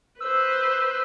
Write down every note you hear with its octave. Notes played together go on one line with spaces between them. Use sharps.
B4 C5 E6